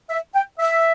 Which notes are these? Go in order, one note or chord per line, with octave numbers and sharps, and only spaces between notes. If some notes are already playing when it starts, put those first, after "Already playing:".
E5
G5
E5